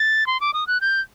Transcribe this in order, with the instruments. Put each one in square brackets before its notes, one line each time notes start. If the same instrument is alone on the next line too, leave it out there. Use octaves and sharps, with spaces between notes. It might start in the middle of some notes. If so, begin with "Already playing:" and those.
Already playing: [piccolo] A6
C6
D6
D#6
F#6
G6